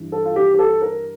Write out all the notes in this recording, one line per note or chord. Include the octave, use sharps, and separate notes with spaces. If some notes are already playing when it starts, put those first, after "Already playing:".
Already playing: G2 E3
A4
F4
G4
G4
A4
A#4